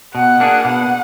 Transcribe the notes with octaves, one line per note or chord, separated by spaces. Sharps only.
B2 F#5
A#3 D4 G#4
B2 F#5